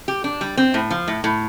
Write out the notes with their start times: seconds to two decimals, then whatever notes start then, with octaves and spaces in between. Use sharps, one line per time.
0.08 G4
0.24 D4
0.41 G3
0.57 C4
0.74 A2
0.91 F3
1.07 A2
1.24 A2